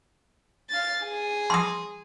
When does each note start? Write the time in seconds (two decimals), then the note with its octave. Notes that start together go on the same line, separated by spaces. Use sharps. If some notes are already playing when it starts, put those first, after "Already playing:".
0.70 F5 A6
1.02 G#4
1.50 C6 D#6